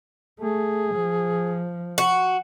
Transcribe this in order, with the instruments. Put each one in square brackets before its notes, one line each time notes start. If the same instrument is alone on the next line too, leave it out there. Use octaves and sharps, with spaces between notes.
[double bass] A3 [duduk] G#4
[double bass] F3
[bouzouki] F#4